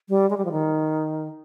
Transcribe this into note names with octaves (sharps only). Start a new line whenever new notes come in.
G3
G#3
G3
F3
D#3